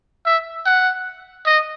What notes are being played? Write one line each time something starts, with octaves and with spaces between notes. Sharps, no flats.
E5
F#5
D#5